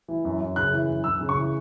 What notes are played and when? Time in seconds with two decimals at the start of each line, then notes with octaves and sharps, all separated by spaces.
0.08 E3
0.25 F#2
0.41 F#2
0.56 C#3 F#6
0.73 E3
0.89 F#2
1.04 F#2 E6
1.21 C#3
1.29 C#6
1.37 E3